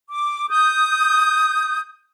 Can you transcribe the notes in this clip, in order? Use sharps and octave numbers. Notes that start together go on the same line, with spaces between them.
D6
D#6 G6